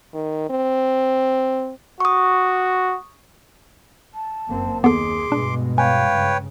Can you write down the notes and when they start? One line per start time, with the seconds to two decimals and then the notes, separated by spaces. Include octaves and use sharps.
0.14 D#3
0.50 C4
2.00 F#4 C#6 D#6
4.14 A5
4.48 F#1 A#3 C4
4.84 D#2 B3 G#4 A4 C6 D6
5.32 G2 B2 G#3 D4
5.78 B4 C#5 F5 G5 G#5
6.13 G2 C#3